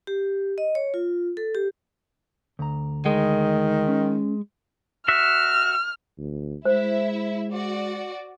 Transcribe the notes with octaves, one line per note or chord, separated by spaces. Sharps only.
G4
D#5
C#5
F4
A4
G4
D2 A#5
D#3 G#3
C#4
F#4 E5 F6
D2
G#3 E4 C5 E5
F#4 D5